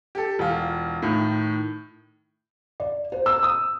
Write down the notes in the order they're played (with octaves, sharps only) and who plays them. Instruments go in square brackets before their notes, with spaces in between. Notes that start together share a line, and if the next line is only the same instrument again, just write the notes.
[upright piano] G4 A4
E1 F4
A2 D#3
[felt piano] D5
C5
E6
D#6